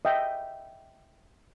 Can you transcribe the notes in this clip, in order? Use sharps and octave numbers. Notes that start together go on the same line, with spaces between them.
D#5 E5 G5